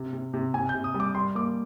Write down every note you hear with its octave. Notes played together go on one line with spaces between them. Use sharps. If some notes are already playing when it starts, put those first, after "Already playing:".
Already playing: C3
C3
C3
C3 G#5
G6
C3
D#6
G3
D6
G3 C6
A#3 D6